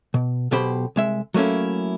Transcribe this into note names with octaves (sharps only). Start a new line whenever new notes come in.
B2
B1 B2 G4 C5 B5
C2 G#3 E5
F#3 A3 A#3 C#4 E4